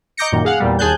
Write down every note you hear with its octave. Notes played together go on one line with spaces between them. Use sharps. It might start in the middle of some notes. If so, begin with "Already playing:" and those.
D#5 A#5 D6 G6 A#6 C#7
F#2 A#2 D#3
G#4 F5 F#5
E2 A#2 G3
D#2 G#4 G#5 A5 F#6 G6